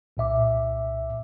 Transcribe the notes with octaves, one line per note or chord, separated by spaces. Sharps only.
C2 A#2 E5 D6